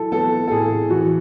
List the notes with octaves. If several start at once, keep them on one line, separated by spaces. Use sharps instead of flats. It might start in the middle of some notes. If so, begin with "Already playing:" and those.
Already playing: F#3 E4 A4
B3 A4
A4
A2 G#4
E3 F#4